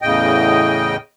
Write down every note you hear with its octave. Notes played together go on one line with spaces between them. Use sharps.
E2 A2 C#3 D#5 G5